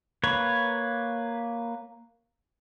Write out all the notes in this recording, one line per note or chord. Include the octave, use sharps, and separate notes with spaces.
A#3 B4 C#5